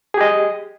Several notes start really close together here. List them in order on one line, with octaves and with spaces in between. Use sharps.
G#4 G4 D#5